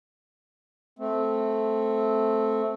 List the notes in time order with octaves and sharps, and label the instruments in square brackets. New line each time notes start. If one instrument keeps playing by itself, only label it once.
[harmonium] A3 C4